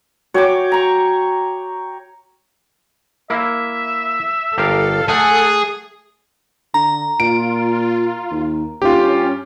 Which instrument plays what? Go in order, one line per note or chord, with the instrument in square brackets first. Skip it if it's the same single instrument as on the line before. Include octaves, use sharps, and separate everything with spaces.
[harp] F#4 [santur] C#5 G5 D6
[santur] A#5 C#6
[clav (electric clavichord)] A#3 E4 [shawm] E5
[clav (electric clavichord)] G1 G4 A#4 [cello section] A4 [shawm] F5
[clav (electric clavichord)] A3 [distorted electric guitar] G#4 [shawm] F#5
[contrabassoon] D3 [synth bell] A#5
[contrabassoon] A#2 [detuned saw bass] F4 [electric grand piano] D7
[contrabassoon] D#2
[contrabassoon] D#2 [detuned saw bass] C#4 [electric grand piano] F4 G4
[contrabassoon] G2